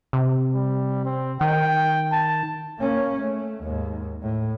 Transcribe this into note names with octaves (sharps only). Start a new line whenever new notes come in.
C3
G3
C4
D#3 G5
A5
A#3 C#4
A3
D#2 G#2
A2